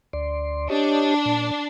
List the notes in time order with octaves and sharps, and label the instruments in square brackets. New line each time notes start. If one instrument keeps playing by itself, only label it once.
[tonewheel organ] D2 D5 C6
[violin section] D4 [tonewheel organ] G4 C#5 D#5
[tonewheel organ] A#2